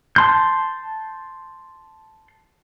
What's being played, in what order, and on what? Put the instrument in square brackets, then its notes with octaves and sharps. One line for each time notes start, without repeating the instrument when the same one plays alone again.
[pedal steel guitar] A5 C6 G6